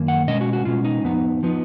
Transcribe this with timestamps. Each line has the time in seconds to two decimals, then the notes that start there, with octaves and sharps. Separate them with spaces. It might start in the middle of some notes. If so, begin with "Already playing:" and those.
Already playing: F#2 D#3 A#3
0.08 F#5
0.27 B2 G#3 C#4 D#5
0.41 F#4
0.53 F#4
0.65 B2 G#3 C#4 F4
0.85 D#4
1.03 F2 F3 B3 D#4
1.43 F3 B3 D#4